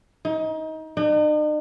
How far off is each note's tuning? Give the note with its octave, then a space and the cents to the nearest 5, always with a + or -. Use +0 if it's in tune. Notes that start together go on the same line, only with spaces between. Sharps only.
D#4 +25
D#4 -45